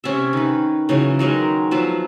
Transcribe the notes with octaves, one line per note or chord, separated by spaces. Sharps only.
C3 C#4 D5 E5
D#3 B4
C#3 E3 F#3
D#3 F#3 G#3 A#4
F3 F#3 B3 E5